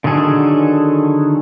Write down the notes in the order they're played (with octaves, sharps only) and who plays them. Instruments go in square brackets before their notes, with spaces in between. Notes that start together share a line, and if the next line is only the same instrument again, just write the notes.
[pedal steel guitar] D3 D#3 F#3 G#4 A4